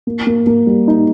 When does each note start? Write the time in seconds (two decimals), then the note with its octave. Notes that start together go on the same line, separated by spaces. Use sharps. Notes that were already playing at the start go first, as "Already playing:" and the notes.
0.07 A#3
0.27 A#3
0.47 A#3
0.67 G3
0.88 D#4